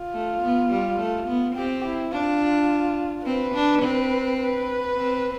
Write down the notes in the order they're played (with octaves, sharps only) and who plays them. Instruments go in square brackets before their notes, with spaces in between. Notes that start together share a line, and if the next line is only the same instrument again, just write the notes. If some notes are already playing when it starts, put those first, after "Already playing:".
Already playing: [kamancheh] F4
[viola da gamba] A3
B3
G3
A3
B3
[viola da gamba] C4 [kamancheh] G4
[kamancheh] E4
[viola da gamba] D4 [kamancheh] F4
[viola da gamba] C4 [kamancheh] B4
[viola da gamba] D4
C4
[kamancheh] B4
[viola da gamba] C4